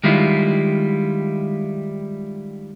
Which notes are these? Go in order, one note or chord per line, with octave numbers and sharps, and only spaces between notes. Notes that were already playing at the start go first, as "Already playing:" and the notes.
D#3 G3 G#3 E4 F4